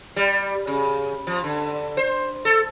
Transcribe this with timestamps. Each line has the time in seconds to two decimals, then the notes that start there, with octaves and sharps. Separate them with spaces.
0.16 G3
0.67 C#3
1.27 F3
1.44 D3
1.97 C5
2.45 A4